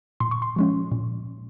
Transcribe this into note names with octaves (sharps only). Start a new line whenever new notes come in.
A#2 C6
C#6
C6
F3 G#3 C#4
A#2